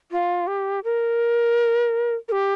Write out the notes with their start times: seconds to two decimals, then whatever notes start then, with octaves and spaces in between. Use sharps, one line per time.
0.12 F4
0.47 G4
0.84 A#4
2.29 A#4
2.32 G4